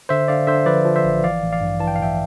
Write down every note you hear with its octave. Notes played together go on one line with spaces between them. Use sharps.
D3 C5 E5
D3 D5 F5
D3 C5 E5
F3 B4 D5
F3
C5 E5
A1
E3 D5 F5
A1
D5 F5
G2
E3 A5
G5
F5
A1 E5 G5